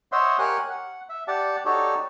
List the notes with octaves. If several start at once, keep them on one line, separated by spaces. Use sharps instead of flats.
C5 C#5 D#5 E5 F#5 C6
G4 A#4 C#5 F#5 G#5 F#6
F#5
E5
G4 D5 F#5 A5
D#4 F#4 G4 A4 C#5 D5